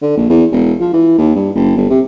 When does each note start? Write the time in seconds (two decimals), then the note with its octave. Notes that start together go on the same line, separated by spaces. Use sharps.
0.02 D3
0.17 A#1
0.30 E2
0.52 E1
0.81 F3
0.93 E3
1.18 D#2
1.36 G2
1.55 F#1
1.77 G1
1.90 C3